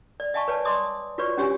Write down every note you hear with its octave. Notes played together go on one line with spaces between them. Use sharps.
D5
D#5 F5 G#5 A5 C#6
B4 C#5 D5 G#5 A5
D5 D#5 C6 D6 D#6
F4 F#4 B4 C#5 D5 C#6
C#4 D4 F#4 G4 C#5 G#5